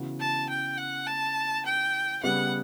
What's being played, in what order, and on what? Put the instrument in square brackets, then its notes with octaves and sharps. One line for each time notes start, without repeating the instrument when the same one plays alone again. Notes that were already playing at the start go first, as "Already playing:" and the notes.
Already playing: [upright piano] C#3 E3 B3 F#4
[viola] A5
G5
F#5
A5
G5
[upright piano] C#3 G3 B3 [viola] F#5